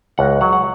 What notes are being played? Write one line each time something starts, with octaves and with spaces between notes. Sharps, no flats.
C#2 F#5
F#3 F#5
F#5